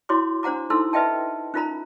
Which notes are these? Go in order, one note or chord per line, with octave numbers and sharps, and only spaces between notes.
E4 F#4 C#5 C6 D6
D4 C5 F#5 A#5 D6
D#4 E4 A4 C6 E6
B4 D#5 E5 G5 A5
C#4 D#4 F4 A#4 A#5 B5